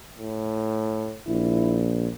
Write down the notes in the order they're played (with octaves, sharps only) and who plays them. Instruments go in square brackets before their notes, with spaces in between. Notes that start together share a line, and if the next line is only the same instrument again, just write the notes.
[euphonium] A2
[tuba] A#1 [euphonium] E4